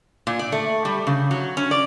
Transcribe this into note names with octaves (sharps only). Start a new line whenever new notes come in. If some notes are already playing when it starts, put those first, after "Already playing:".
A#2
D5
A3
G3
C#3
F#3
C#4
D5